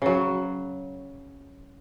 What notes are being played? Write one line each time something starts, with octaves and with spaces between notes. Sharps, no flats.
C#3 F#3